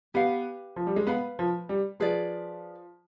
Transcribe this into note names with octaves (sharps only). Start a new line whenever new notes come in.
B3 G4 B4 F5
F3
G3
G#3
B3 B4 F5 B5
F3
G3
F3 G#4 B4 D5